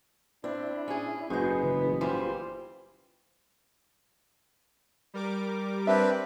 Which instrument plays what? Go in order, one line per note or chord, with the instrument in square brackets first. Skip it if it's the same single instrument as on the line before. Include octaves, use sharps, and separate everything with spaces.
[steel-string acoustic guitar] C4 [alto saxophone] D4 [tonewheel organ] E4
[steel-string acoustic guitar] C#4 G#4
[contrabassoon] F#1 [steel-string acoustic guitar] G#2 G#3 [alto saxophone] B3 [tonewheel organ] F#4 G#4 C5
[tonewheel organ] C#3 E3
[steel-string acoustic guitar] D#3 E3 G3 [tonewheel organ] F4 [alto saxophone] C5
[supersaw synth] G3 A#4 D6
[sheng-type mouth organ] C4 D4 B4 [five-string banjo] G4 E5